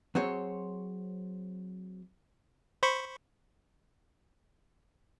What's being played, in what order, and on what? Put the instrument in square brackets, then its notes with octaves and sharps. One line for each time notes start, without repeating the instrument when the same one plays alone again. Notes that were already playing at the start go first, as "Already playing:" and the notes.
[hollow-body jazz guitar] F#3 C4 G#4 C5 C#5
[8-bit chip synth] C5 B5 C#6